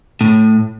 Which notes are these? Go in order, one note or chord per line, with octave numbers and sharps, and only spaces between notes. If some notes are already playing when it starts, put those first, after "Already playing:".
A2